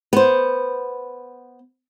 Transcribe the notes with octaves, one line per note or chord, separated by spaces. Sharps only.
B3 C5